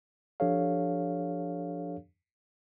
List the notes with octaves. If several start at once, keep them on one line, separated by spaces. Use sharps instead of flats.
F3 D4 G4 A4 C#5 F5